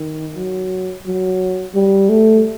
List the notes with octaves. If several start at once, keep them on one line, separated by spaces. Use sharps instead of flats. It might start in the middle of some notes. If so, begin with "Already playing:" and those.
Already playing: D#3
F#3
F#3
G3
A3